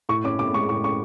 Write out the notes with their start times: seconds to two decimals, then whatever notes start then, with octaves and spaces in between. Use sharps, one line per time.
0.09 A2 C#6
0.24 C#4 D6
0.39 A2 D6
0.54 G#3 C#6
0.69 A2 C#6
0.84 C#4 C#6